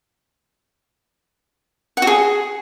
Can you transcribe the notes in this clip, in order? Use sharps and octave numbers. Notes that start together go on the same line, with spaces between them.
F#5
F#4
G#4